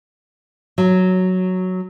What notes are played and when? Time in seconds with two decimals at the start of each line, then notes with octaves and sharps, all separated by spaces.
0.78 F#3